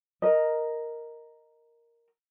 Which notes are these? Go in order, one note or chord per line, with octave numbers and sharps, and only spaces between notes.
A#4 D#5